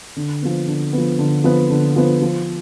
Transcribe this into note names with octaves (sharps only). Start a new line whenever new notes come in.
D3
F3 B3
D3
F3 B3
D3
F3 B3
D3
F3 B3
F3